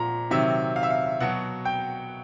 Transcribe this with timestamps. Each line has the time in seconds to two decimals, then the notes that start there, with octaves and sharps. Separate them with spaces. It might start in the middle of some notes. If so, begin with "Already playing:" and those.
Already playing: A#2 F3 A#5
0.31 C3 D#3 F#3 E5
0.76 F5
0.83 E5
0.91 F5
1.20 B2 F#3 F#5
1.65 G5